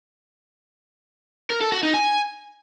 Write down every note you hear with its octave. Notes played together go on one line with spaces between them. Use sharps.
A#4
A4
F#4
D#4
G#5